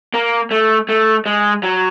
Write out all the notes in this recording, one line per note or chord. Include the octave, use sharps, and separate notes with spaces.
A#3
A3
A3
G#3
F#3